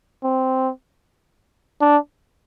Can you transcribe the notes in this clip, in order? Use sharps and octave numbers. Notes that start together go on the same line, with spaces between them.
C4
D4